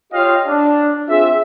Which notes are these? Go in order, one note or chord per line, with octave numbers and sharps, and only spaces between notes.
F4 G4 C#5 D#5 F5 G5
D4
C4 F4 G#4 E5